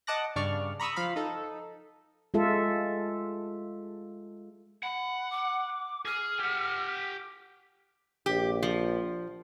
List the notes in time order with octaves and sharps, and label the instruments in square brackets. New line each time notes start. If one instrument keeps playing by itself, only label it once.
[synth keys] D#5 F#5 A5 D6 F#6 A#6
G2 C#3 D4 D5 C#6 F6
A#5 B5 C#6 D#6 E6
F3 F5 B5
D#4 A4
[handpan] G#3 F4 A4 E5
[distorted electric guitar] F#5 [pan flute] B5
[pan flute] D6
[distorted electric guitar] G#4 [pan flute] F6
[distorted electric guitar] G4 F#5
[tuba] A#1 [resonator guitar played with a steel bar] G4
[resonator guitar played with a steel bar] F3